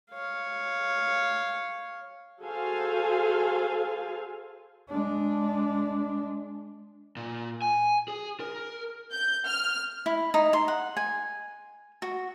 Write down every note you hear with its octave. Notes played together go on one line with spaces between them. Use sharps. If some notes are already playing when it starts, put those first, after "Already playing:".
C#5 F5
F#4 G#4 A4 C5 F5 G#5
G#3 D4
A#2
G#5
G#4
A#4
G6
F6
E4
D#4
C6
F#5
G#5
F#4